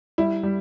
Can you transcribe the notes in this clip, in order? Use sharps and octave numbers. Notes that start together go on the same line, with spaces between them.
G3 E4
G3